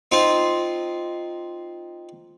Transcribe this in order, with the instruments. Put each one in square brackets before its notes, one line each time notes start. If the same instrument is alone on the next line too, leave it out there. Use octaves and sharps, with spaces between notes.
[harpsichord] C4 D#4 F4